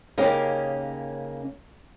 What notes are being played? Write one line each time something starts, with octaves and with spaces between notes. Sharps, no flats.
C#3 A#3 C#4 D#4 G4